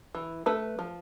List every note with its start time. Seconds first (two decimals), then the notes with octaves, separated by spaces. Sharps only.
0.15 E3
0.46 A3 B4
0.79 F3